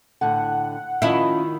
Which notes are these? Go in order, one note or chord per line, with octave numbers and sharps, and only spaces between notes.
A2 D3 F#5
D#3 F3 C#4 E4 D#5